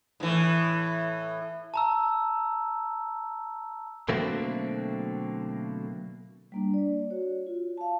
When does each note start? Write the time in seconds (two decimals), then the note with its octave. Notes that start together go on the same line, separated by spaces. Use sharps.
0.20 A2 E3
1.74 A5 A#5 E6
4.09 B2 D3 F#3 A3 A#3 C4
6.52 G3 A#3 D4
6.74 D5
7.10 F#4 C#5
7.47 F4
7.78 F5 A5